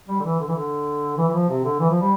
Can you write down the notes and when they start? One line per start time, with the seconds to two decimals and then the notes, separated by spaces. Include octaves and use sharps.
0.08 G3
0.20 D3
0.24 E3
0.39 D3
0.48 E3
0.55 D3
1.17 E3
1.28 E3
1.33 F3
1.49 C3
1.64 D3
1.79 E3
1.90 F3
2.01 G3